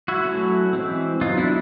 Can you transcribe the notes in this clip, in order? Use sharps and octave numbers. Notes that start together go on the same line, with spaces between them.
E4 F#4
F#3 A3 C#4
E3 G#3 C4
F#3 B3 D#4 F4
D4 E4